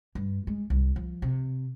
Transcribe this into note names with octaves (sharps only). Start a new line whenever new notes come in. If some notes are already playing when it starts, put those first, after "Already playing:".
G2
G#3
C2
F3
C3